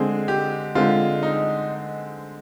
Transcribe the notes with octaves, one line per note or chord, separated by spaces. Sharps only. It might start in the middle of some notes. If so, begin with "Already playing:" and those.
Already playing: D3 G#3 C4 G#4
G4
D3 G#3 C4 F4
D#4